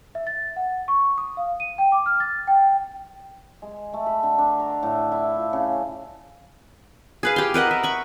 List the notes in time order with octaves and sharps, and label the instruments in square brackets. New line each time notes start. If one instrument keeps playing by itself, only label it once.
[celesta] E5
A6
F#5
C#6
D#6
F5
D#7
G5
D6
F6
A6
G5
[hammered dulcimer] G#3
A3
B5
D3
D4
A#5
A2
E4
F4
C#3
[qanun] G#4 B4 F5
G4 C6
A#4 B4 D#5 F#5
E5
B5 C#6